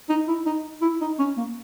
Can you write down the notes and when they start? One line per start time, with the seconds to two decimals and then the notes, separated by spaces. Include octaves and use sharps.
0.10 D#4
0.28 E4
0.46 D#4
0.82 E4
1.01 D#4
1.19 C#4
1.37 A#3